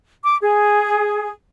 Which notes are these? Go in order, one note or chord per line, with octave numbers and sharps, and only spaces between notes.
D6
G#4